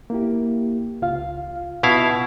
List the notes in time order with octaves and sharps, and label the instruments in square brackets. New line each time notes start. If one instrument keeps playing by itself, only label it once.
[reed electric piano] A#3 E4 G4
C#2 F4 F5
[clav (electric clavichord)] B2 E4 F5 [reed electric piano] F4 B4